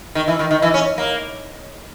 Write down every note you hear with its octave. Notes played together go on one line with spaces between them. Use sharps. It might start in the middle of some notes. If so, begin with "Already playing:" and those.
D#3
E3
D#3
D#3
E3
C#4
A#3